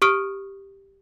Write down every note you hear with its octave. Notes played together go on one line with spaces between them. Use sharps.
G4 C#6 D#6 F6 D7